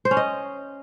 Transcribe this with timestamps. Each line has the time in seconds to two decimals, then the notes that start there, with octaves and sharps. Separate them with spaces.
0.05 C5
0.11 C#4
0.17 D#5